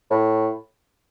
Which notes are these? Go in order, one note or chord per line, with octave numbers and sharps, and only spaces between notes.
A2